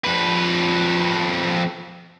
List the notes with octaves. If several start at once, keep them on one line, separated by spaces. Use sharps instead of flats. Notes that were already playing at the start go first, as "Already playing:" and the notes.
F2 B4